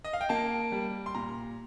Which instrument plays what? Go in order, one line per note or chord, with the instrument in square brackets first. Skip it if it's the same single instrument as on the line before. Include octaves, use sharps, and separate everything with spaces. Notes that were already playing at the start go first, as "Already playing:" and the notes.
[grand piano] D#5
F5
G5
A#3 A5
G3
C6
A#2 A#5